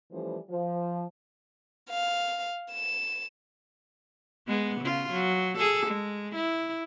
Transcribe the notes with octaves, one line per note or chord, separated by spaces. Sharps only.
E3 F3 G3 A3 C#4 C5
F3
F5
E7
G#3 B3
C#3 F4
F#3
G#4 A4
G#3
E4